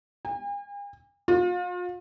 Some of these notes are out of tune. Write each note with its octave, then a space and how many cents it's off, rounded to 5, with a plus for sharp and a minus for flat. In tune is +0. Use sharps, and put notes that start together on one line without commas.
G#5 -45
F4 +40